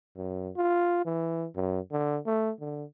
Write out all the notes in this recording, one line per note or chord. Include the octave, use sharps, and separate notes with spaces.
F#2
F4
E3
F#2
D3
A3
D3